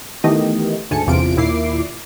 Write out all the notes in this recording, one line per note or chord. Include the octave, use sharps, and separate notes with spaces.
D#3 E3 A3 B3 G4 D#5
D2 G#2 G#5 A5 C#7
G1 E2 C3 F4 D7
D#2 A#2 E4 D6 C7